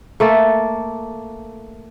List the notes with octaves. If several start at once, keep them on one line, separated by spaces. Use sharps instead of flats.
A3 A#3 A4